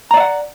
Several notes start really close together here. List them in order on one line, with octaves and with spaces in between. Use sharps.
A#5 D5 E5 F#5